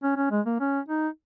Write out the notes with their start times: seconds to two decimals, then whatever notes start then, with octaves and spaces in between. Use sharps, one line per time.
0.03 C#4
0.17 C#4
0.31 G#3
0.46 A#3
0.60 C#4
0.89 D#4